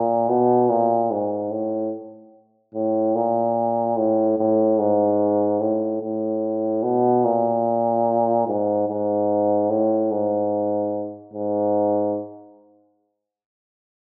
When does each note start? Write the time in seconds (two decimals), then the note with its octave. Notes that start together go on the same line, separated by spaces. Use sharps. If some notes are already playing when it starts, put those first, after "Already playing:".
Already playing: A#2
0.29 B2
0.70 A#2
1.11 G#2
1.51 A2
2.75 A2
3.15 A#2
3.97 A2
4.38 A2
4.79 G#2
5.60 A2
6.01 A2
6.83 B2
7.25 A#2
8.47 G#2
8.88 G#2
9.70 A2
10.11 G#2
11.33 G#2